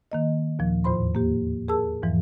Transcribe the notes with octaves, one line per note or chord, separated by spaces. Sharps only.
D#3 A#3 D#5
D#2 A#2 F3
E2 A2 F4 C5 B5 C6
A#3 G4
G#4 A#4 A5 E6
E2 G#2 E3 F3